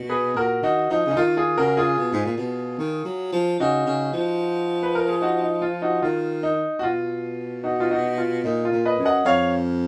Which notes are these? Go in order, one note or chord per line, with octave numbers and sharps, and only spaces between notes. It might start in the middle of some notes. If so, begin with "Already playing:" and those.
Already playing: B2
G#4 B4
A#2 F#4 A#4
D#3 D#4 F#4
F3 D#4
C#3
D#4
D#3 F4
F4 G#4
C#3 F#4 A#4
F4 G#4
B2
G#2
A#2
B2
D#3
F#3
F3
C#3 D#4 F#4
C#3
F3
B4
A#4
G#4
D#4 F#4
D#4
F4
D#4 F#4
D#3 F4
D#4
F#4
B2 F4
D#4 F#4
F4
D#4 F#4
F4
A#2 D#4
F4
A#2
B4 D#5
F#2
D#5 F#5
F2 C#5 F5